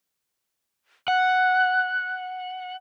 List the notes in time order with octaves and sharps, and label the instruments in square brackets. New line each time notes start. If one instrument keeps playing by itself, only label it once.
[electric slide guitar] F#5 [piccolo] F#6